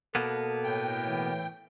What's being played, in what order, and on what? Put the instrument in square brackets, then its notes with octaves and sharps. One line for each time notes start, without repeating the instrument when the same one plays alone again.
[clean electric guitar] B2 A#3 B3 [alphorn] A4
[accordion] A2 G5
[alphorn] E3